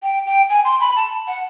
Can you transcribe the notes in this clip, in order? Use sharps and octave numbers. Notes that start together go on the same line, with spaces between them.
G5
G5
G#5
C6
B5
A5
F#5